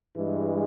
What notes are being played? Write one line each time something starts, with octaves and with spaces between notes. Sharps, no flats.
G2 E3 G#3